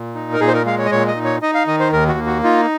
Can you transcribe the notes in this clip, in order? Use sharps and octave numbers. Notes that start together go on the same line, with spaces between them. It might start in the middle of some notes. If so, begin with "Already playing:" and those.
Already playing: A#2
D#4
A#4
A#2 G#4
C5
A#4
G#3 F5
C#5
D#5
A#2 C#5
D#5
D#4
C#5
D#4 D#5
F5
D#3 D#5
C5
D#2 A#4
F#4
A#3
F#4
D#4 F4